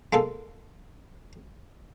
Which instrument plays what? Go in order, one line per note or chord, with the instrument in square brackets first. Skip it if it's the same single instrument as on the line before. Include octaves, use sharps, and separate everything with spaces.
[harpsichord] G#3 A#3 A4